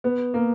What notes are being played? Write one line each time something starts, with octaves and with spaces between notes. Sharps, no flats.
B3
A#3